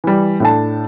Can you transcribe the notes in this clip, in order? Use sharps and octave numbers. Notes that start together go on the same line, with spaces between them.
E3 G3
A2 D4 A5